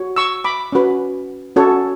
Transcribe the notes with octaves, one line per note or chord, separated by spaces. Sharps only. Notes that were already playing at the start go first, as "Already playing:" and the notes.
Already playing: F#4 C#5
C#6 E6
B5 D6
C#4 F#4 B4
C#4 F#4 A4 C#5